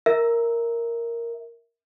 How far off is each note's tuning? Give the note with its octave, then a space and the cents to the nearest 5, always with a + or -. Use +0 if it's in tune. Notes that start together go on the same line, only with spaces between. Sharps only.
A#4 +0 E5 -15